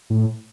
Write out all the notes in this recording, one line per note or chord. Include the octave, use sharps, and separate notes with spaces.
A2